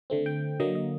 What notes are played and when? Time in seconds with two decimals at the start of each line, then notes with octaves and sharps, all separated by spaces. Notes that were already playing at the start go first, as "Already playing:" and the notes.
0.10 D3 A3 C4
0.26 G5
0.60 D3 F#3 A#3 D#5
0.75 D#5